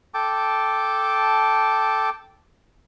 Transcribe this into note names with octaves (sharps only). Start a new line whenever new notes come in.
A4 G5 A5 D6